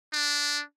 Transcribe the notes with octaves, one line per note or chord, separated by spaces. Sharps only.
D4